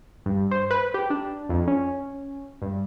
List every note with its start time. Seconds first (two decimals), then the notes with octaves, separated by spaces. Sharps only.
0.26 G2
0.51 C5
0.71 B4
0.94 G4
1.10 D4
1.49 F2
1.67 C#4
2.62 G2